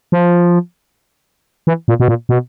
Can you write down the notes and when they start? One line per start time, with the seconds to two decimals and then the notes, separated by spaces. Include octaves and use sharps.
0.12 F3
1.67 E3
1.88 A#2
2.00 B2
2.08 A#2
2.29 B2